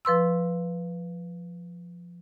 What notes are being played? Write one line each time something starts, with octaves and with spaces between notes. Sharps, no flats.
F3 B4 C6 E6